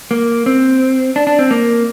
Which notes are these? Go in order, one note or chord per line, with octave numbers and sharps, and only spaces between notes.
A#3
C4
D4
D4
C4
A#3